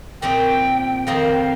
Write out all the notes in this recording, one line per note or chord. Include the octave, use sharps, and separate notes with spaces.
A#2 F3 C4 D#4 G5
F2 D#3 C4 D#4 F5